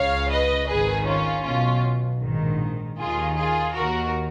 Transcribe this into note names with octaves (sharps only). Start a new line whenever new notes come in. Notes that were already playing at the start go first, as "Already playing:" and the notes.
Already playing: C#2 C#3 C#5 F5
B4 D#5
G#1 G#2 D#3 G#4 B4
C#4 F4
B1 B2 C#4 F4
A#1 G#2 D#3
D#2 D#3 F4 G#4
F4 G#4
D#2 D#3 F#4 A#4